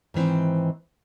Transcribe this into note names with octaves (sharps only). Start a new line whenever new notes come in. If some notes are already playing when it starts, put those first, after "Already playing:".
G#2 D#3 E3 C4